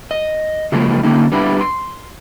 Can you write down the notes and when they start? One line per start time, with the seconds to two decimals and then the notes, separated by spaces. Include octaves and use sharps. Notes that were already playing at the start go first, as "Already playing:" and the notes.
0.11 D#5
0.72 C#3 F3 F#3 G#3 A#3 F4
1.03 D3 A#3 C#4 D#4
1.32 G3 B3 D4 E4
1.61 C6